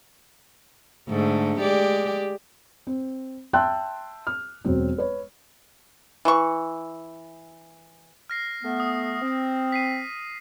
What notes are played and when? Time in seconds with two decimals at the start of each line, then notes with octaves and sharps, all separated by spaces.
1.09 G#2 D3 A3
1.59 G#3 G4 D5
2.87 C4
3.53 E5 G5 A5 C6 E6 F#6
4.27 F6
4.65 E1 F#3 C4
4.98 B4 C#5
6.25 E3 C#6
8.30 F6 A#6 C7
8.63 A3 B3
8.80 D#6
9.22 C4
9.72 B6 C7 D#7